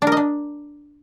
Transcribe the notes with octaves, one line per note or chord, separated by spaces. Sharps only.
D4
A#4
D#5
D4